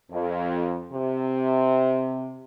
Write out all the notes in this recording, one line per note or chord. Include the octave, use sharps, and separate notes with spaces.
F2
C3